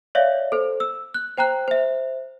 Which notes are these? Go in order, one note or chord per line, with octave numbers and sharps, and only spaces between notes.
C#5 D5 E5 F5
A4 C5
E6
F#6
C5 G5 A#5 F#6
C5 E5